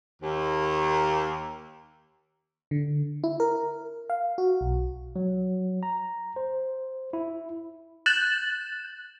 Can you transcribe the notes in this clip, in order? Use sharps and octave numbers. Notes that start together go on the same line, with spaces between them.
D#2
D3
E4
A#4
F5
F#4
B1
F#3
A#5
C5
E4
F#6 G6 A6 E7 F#7